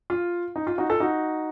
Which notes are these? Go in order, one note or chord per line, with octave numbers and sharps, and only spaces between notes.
F4
D#4
F4
D#4 F#4
F4 A4
D#4 F#4